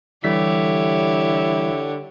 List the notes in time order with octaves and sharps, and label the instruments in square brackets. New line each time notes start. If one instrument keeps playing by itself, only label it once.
[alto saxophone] D3 [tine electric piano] E3 G3 B6 [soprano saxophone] E4 [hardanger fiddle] G4 C#5